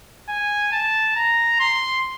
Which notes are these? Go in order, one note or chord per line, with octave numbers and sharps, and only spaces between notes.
G#5
A5
A#5
C6